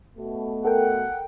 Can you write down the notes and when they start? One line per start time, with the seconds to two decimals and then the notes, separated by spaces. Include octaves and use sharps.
0.18 B2 A3
0.65 A4 A#4 F#5 G5